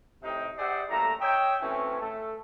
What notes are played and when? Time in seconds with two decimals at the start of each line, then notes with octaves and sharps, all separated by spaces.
0.23 A2 C3 D#4 D#5 G5
0.57 G4 G#4 C5 D5 E5 F#5
0.90 F#2 A2 A3 A#3 A#5
1.20 C#5 D#5 E5 G5
1.61 B2 E3 A3 C4 C#4
2.00 A3 A4